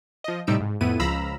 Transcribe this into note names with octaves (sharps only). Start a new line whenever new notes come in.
F3 D#5
A2 C3 G3 D#4 E6 D7
G#2
F2 A2 B3 E4 D#7
C#2 F3 F5 A#5 B5 E6